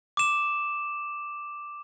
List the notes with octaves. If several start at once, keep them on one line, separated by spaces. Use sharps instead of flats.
D6 E7